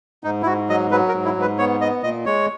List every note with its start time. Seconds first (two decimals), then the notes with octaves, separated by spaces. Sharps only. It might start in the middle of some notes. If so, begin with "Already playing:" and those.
0.24 G#2 D#4
0.42 E4
0.46 G#2 F#4
0.69 F#3 D#5
0.91 F#3 B4
1.08 A#4
1.14 G#2
1.25 E4
1.37 G#2 B4
1.58 B3 C#5
1.81 B3 D#5
2.03 A#2 D#5
2.26 G#3 C#5